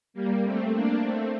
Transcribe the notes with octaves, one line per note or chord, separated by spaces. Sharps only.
G3 A#3
A3 C4
A#3 D4
A3 C4